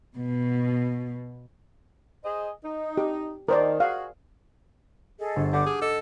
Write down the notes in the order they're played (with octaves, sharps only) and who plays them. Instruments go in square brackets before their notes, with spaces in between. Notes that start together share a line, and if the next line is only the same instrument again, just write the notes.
[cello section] B2
[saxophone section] G#4 C5 D#5
D#4
[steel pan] G4
[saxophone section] D#3 [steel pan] A#4 C5 D5
[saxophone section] F#4 G#4 [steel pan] F5
[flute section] G#4 A4 D#5
[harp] G1
[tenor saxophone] D3 [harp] F#5 A5 G6 [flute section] D6
[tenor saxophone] G#4 [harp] F6 G6
[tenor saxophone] A4 [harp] D#5